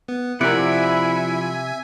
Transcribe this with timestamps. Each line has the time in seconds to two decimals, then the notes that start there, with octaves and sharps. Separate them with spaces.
0.08 B3
0.41 C3 F3 E4 A#4 D5 E5 F#5 G#5